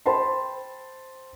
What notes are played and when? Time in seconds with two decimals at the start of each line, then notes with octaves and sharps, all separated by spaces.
0.06 C5 G5 A5 B5 C6